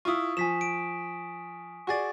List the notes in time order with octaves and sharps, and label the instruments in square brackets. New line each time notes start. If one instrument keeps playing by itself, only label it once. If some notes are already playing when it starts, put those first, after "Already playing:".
[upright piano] E4 F4 [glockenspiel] C#6 D#6
[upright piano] F3 [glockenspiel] G#5 B6 E7
[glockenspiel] D7
[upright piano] F#4 G#4 D5 [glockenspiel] C#6 A6